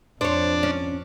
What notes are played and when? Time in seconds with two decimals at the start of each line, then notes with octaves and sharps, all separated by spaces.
0.21 F2 D4 C5 C#5
0.63 C#4